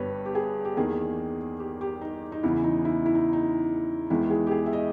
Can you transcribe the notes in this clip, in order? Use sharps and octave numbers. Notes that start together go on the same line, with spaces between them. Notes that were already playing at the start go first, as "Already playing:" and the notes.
Already playing: G1 G2 G3 B3 B4 C#5
G4
G#4
G4
E2 D#3 A#3 G#4
G4
G4
D#4
D#4
E2 C#3 E3 E4
D#4
E4
E4
D#4
D#4
E2 D#3 G#3 B3 E4
G#4
G4
G#4
E5
D#5